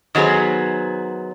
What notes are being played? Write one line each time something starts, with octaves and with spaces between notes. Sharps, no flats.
D#3 F#3 B3 G#4 C5